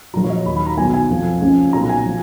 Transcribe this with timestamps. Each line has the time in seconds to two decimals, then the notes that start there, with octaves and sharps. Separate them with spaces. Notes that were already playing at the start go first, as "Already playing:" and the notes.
0.14 A#1 A#2 F#3 A#5
0.24 C#5
0.30 D#5
0.45 D#2 D#3 F#3 B5
0.56 B5
0.67 A#5
0.77 B1 B2 F#3 G#5
0.93 G#5
1.10 F1 F2 F3
1.41 C#2 C#3 F3
1.73 B1 A#2 F#3 A#5
1.89 G#5
2.06 F3